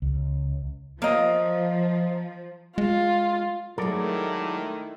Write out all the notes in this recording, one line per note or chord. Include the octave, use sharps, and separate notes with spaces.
C#2
F3 A#3 D#5
G#3 F4
D#3 F#3 G#3 A3 E4 A4 A#4 D5